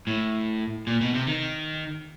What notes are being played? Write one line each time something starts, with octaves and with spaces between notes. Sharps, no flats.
A2
A#2
B2
C3
D#3